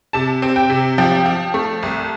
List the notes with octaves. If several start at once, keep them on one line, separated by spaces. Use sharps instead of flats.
C3 A5
C4
G5
C3
F3 G5
F3
A3
C2